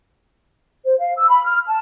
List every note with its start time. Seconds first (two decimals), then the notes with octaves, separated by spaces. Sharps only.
0.85 C5
0.99 F5
1.17 E6
1.29 B5
1.44 F6
1.68 A5